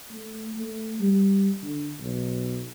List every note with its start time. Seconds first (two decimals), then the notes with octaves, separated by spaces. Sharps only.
0.11 A3
0.56 A3
1.00 G3
1.63 D3
2.00 B1